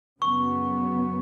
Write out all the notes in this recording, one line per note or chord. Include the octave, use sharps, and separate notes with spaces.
F#2 C#3 F#3 B3 C#6